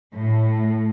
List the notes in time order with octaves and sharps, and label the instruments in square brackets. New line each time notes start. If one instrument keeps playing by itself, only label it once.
[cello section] A2 A3